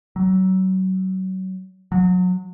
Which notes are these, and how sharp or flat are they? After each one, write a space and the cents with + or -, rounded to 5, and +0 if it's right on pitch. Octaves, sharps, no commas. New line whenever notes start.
F#3 +25
F#3 -30